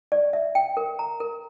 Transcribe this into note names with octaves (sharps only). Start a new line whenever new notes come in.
D5
E5
G5
A#4
A#5
A#4